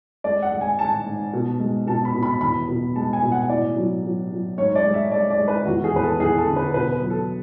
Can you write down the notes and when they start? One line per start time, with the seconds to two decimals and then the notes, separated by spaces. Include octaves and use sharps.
0.24 G#3 D5
0.42 F#5
0.52 G#3
0.61 G#5
0.79 G#3 A5
1.06 G#2
1.33 B2
1.60 G#3
1.87 B2 A5
2.05 B5
2.14 B2
2.23 B5
2.41 E2 B5
2.69 B2
2.96 G#3 A5
3.13 G#5
3.22 B2
3.32 F#5
3.49 A2 D5
3.76 F#3
4.04 F#3
4.31 F#3
4.58 G#2 C#5
4.76 D5
4.85 G#3
4.94 E5
5.12 G#3 D5
5.30 D5
5.39 G#3
5.48 B4
5.66 E2 F#4
5.84 G#4
5.93 E2 B4
6.02 A4
6.20 E2 G#4
6.38 A4
6.47 D3
6.56 B4
6.74 B2 B4
6.92 B4
7.01 F#3
7.10 A4